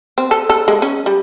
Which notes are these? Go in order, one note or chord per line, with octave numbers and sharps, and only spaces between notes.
C4
A4
A4
G#3
C#4
G3